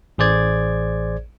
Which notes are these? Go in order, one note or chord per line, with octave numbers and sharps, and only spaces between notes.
A1 G#4 C5 D5 G#6